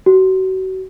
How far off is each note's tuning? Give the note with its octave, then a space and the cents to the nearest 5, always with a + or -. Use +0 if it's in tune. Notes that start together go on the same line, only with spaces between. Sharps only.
F#4 +30